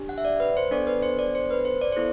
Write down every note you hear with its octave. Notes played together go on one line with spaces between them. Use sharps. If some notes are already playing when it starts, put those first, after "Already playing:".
Already playing: D4 G4
F#5
E5
D5
B4
C5
B3 D4 A4 D5
B4
C5
D5
C5
B4
C5
D5
B3 E4 A4 C5